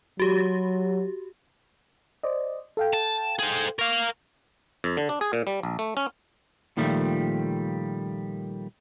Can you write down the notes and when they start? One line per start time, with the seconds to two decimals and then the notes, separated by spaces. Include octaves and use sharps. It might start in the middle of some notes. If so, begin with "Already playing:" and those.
0.20 F#3 F#4 G4
2.23 C5 D5 D#5
2.77 A4 F5 G5
2.93 A5
3.39 G#4 C5
3.79 A#4 F5 C#6
4.84 F2
4.97 D3
5.09 D4
5.21 G#4
5.33 A#2
5.47 G3
5.63 A#1
5.79 A3
5.97 C#4
6.77 A#2 D#3 F3 G3 A3